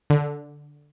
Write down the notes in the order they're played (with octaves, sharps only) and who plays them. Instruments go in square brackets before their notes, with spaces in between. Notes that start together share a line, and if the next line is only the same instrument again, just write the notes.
[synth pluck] D3